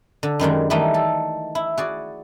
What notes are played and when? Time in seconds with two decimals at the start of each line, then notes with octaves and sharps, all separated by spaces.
0.23 D3
0.39 F#2 D#3 G3 G#3
0.70 D#3 E3 G3 A3 D#4
0.94 A4
1.55 E4
1.78 F#4 G#4 D5